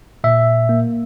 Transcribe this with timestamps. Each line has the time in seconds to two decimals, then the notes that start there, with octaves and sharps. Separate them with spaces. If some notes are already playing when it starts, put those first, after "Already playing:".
0.24 A#2 E5
0.69 A#3